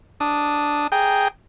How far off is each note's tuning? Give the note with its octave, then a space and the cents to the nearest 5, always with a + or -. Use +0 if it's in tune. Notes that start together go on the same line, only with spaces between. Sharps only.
D4 +0 D#6 +0
G#4 +0 G5 +0 A#5 -5